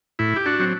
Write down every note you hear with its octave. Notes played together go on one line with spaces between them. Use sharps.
A2 E4
G4
D4 F#4
F#3 C4